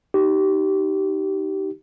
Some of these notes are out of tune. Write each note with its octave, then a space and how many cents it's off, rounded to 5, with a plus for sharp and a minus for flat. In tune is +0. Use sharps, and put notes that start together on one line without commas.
D#4 +0 G4 -25